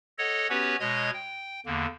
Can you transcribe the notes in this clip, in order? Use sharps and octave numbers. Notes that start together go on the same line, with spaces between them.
A4 C#5 D#5 F#5
B3 C#4 F#4 G4 B4 C#5
B2 G#3 C#5 D#5 G#6
G5
E2 D3 A#3